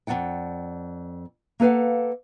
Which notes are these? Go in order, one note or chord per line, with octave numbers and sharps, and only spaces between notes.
F2 G#3 D5 F#5 G5
A#3 A4 B4 F5 F#5